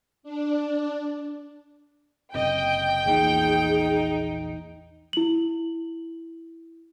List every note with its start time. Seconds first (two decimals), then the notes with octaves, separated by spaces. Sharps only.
0.23 D4
2.35 F#1 C3 D#5 G5
3.06 A#1 E2 A#2 D#4 G#4
5.13 E4 F#7